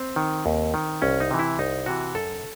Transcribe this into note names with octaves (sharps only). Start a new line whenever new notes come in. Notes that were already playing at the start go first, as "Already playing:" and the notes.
Already playing: C4
D#3
D#2
D#3
C2 C#4
D#4
C3 E3
E4
C2 D#4
C3 E3 F#4
F#2 A4